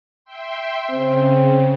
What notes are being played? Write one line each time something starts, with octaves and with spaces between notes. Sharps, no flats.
E5 G5 C6
C#3 C4